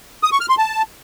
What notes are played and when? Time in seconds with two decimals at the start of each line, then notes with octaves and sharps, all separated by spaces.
0.23 D#6
0.32 C#6
0.41 F6
0.49 C6
0.58 A5